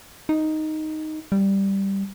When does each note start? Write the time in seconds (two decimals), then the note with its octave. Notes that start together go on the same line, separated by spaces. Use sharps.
0.29 D#4
1.32 G3